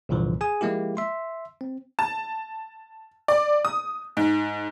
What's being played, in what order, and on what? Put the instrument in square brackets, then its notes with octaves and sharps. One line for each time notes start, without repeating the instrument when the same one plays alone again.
[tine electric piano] C2 G2 A#2 D3 E3 F3
G#4 G#5 D#6
F3 G#3 A#3 E4 G4
E5 C6
C4
[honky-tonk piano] A5
D5
D#6
G#2